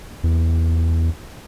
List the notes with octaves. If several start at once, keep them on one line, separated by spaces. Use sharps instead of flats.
E2